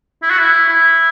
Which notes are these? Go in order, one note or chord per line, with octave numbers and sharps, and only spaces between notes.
E4
F#4
E4
E4